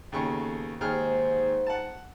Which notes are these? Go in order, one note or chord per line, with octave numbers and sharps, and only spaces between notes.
D#2 C#3 B3 A4 B4 C#6
D#2 G#2 G#4 C5 F6
F#5 A5